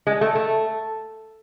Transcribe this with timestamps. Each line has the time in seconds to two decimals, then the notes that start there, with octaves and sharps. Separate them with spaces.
0.07 G#3
0.21 A3
0.35 A3